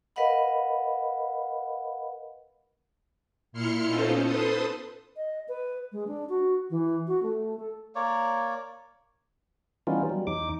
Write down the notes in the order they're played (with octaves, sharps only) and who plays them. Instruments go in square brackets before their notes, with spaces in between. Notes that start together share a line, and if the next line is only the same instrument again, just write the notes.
[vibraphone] A#4 B4 D#5 F5 F#5 B5
[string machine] A#2 E4 C6 F6 C#7
B3 C#4 D#4 F4 A4 C5
A4 B4 C5 C6 D#6
[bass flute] D#5
B4
G#3
D4
F#4
E3
F#4
A3
A4
[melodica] A#3 C#5 D5
[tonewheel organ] E3 G3 B3 C#4 D#4 F4
F#3 G3
E2 D#4 D6